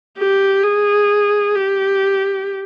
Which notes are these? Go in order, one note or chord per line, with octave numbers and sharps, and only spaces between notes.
G4
G#4
G4